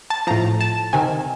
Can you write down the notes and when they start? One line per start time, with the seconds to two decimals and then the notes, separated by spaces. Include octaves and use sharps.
0.10 A5
0.27 A2 F3 A#5
0.61 A5
0.93 C3 D#3 G#5